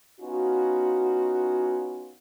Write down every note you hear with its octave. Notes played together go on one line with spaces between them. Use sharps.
B3 C#4 D#4 F4 F#4